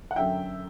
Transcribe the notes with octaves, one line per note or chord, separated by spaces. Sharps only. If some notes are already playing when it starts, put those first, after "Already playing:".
F#5
F#2 D3 F#3 E5 G5